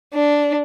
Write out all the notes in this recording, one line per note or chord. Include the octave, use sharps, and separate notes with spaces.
D4